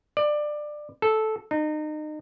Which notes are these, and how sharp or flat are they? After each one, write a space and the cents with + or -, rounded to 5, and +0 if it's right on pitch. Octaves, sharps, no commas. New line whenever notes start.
D5 +20
A4 -10
D#4 -30